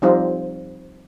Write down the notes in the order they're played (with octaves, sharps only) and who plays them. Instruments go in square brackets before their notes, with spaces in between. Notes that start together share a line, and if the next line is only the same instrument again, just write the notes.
[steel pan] F3 G3 C4 D#4 F4